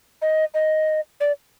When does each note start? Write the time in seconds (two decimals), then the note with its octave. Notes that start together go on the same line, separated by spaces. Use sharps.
0.22 D#5
0.54 D#5
1.20 D5